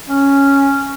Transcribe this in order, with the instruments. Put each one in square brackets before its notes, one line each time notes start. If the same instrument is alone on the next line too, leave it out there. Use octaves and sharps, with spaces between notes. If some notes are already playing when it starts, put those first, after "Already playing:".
[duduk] C#4